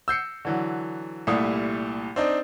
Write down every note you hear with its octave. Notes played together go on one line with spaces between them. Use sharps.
E6 G6 C7 C#7
D3 E3 F#3
C2 A#2 G3 A3 E4 D#6
C4 D4 D#4